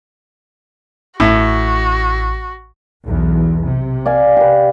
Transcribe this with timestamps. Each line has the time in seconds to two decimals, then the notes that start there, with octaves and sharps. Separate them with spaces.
1.20 A1 A2 F#4
3.04 B1 E2
3.66 C3
4.06 D5 F5 G#5
4.37 G4 B4